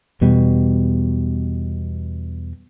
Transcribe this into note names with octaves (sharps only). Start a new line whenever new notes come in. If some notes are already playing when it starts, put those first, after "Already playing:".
E2 B2 G3